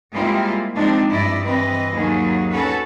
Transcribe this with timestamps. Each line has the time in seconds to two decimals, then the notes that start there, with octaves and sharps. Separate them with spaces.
0.13 G3 G#3 A#3 C4 E4 F4
0.75 F3 G#3 C4 D4 D#4
1.10 G2 E4 D5 D#5
1.44 E3 C4 B4 D#5
1.94 D#2 F#3 A#3 G#4
2.51 C#4 F#4 A4 B4 C#5